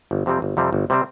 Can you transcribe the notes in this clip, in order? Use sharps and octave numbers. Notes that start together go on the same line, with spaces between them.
G1
F2 C3 G3 C4
G1
F2 C3 G3 C4
G1
C3 G3 C4